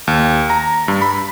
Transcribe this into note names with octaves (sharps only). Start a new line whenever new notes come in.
D#2
A#5
G2
B5